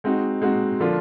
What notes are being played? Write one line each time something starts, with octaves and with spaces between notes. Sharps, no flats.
G#3 C4 D#4 F#4
G#3 C4 D#4 F#4
D3 F3 A#3 D4 F4